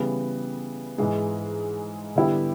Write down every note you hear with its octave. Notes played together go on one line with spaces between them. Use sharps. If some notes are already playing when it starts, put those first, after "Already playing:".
Already playing: C#3 E3 G3 B3
G#2 E3 G#3
D3 G3 B3 E4 G4